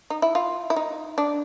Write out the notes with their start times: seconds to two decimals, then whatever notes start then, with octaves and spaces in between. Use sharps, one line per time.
0.10 D#4
0.22 E4
0.35 F4
0.70 E4
0.76 D#4
1.18 D4